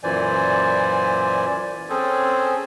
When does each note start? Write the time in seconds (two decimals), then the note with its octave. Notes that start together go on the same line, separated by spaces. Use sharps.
0.03 F#2 A#2 E3 C5 D5 G#5
1.89 C4 C#4 G#4 A4 C5 G#5